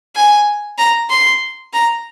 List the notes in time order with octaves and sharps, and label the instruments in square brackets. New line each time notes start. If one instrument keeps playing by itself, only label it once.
[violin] G#5
A#5
C6
A#5